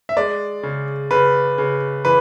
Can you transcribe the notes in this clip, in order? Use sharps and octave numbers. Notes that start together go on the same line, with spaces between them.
E5
G#3 D5
C#3
C#3 B4
C#3
E3 B4